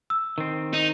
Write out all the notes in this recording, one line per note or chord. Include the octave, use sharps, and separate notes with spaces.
E6
D#3 C4
D#4